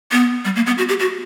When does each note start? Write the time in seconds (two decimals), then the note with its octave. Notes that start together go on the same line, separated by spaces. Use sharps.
0.12 B3
0.45 G3
0.56 A#3
0.66 B3
0.78 F#4
0.89 G4
0.99 F#4